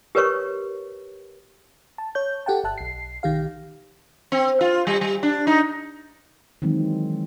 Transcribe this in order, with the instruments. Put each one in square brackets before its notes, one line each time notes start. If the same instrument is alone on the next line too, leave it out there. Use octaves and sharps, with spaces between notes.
[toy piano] G4 A#4 B4 C#5 C#6
[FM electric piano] A5
C#5 G6
G4 A4 F#5 G5 A5
G1 E5 A5 F#6
B1 C7
B1 D#3 G4 F5
[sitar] C4
F4
G3
G3
D4
D#4
[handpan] D#3 E3 F#3 G#3 C4